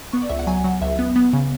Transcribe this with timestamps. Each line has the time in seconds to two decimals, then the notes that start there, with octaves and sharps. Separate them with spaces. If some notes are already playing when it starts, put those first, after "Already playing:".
0.13 B3 C#6
0.22 D5
0.29 C#2 E5
0.39 F#5
0.47 F#3 G#5
0.64 F#3 F#5
0.81 C#2 E5
0.99 B3
1.16 B3
1.33 C#3